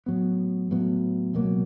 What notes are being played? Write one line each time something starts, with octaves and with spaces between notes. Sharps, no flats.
A2 F#3 B3
A2 F#3 B3
C#2 B2 F#3 A#3